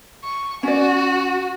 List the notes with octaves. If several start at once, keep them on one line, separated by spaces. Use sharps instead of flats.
C#6
C#4 F#4 D5